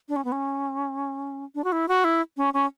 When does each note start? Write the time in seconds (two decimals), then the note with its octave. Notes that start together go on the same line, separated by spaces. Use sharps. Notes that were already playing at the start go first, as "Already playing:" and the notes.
0.09 D4
0.16 C#4
0.24 B3
0.32 C#4
1.55 D4
1.64 F#4
1.72 E4
1.88 F#4
2.04 E4
2.37 C#4
2.54 C#4